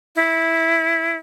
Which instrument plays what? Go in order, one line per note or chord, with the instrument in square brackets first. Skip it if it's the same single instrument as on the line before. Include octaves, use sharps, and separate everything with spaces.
[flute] E4